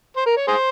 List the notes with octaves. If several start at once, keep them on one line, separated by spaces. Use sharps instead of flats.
C5
A#4
C#5
G#4 C5